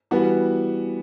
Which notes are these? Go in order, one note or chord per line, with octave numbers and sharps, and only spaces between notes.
E3 G3 B3 F#4